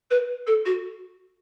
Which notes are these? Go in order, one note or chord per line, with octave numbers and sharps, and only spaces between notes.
B4
A4
F#4